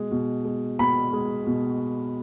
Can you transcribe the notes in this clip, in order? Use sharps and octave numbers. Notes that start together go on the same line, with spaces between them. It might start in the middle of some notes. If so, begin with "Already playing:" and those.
Already playing: B2 G#3
B2
G#3
B2 B5
G#3
B2